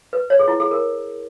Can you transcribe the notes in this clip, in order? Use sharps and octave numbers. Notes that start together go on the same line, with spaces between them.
B4
C#5
G#4
E4
G#4
A#4